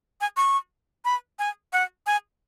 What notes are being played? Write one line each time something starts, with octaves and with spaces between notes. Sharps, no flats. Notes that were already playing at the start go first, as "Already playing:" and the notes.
G#5
C#6
B5
G#5
F#5
G#5